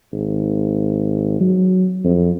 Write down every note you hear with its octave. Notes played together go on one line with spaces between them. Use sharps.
G#1
F#3
F2